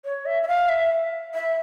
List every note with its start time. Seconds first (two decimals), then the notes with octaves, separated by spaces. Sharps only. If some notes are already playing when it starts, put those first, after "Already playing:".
0.05 C#5
0.26 E5
0.43 E5
0.48 F5
0.69 E5
1.34 E5